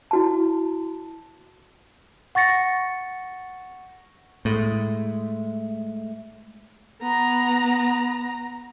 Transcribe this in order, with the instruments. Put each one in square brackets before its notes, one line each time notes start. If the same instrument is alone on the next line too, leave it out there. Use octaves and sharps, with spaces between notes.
[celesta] E4 F#4 A5
F#5 C#6 A6 A#6 C#7
[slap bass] A2 [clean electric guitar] G#3 A3
[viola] B3 A#5